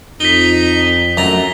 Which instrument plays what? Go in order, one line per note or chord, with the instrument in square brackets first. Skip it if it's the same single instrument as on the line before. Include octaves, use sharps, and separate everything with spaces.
[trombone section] F2 [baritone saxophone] D#4 [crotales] B6 G7
[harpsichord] F#2 A#5 [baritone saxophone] A3